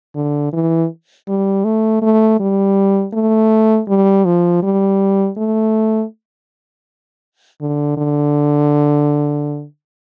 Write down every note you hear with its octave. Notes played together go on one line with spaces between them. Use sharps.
D3
E3
G3
A3
A3
G3
A3
G3
F3
G3
A3
D3
D3